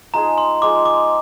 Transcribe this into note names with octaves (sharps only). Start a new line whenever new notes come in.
F3 G#3 D#4 G#4 A#5
C6
F3 G#3 D#4 G#4 D6
D6